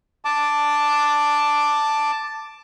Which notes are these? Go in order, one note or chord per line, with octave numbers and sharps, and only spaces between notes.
A5 D6